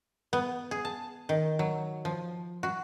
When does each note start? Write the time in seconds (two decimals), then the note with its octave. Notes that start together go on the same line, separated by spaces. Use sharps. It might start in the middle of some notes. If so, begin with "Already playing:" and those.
0.33 B3
0.71 G#4
0.85 A5
1.29 D#3
1.59 F#3
2.05 F3
2.63 F#4